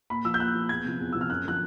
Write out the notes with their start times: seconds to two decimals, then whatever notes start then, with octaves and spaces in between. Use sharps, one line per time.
0.10 A#2 B5
0.25 F3 E6
0.34 G6
0.40 A#2 F#6
0.55 F3
0.69 E2 G#6
0.84 C3 F3
1.00 E2
1.13 C3 F3 E6
1.21 F6
1.29 F#2 F#6
1.45 D3 F3 F#6